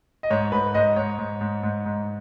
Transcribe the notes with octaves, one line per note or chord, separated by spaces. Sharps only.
D#5
G#2 C#5
G#2 B4
G#2 D#5
G#2 C#5
G#2
G#2
G#2
G#2